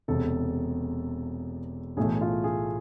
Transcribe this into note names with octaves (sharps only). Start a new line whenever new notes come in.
E1 E2 C3 A4
B1 A2 E3 A3 G#4
F4
G#4